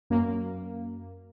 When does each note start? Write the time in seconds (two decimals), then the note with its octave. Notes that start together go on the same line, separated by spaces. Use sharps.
0.10 F#2 A#3